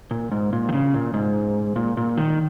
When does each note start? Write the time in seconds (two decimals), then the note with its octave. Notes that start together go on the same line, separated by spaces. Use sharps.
0.11 A#2
0.31 G#2
0.53 A#2
0.69 D#3
0.73 C#3
0.94 A#2
1.14 G#2
1.76 A#2
1.97 A#2
2.17 D#3